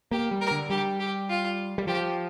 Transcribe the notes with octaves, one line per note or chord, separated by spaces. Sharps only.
A#3 G4
G3
A#4
D3
G3 G4
G4
F4
G3
F3 G4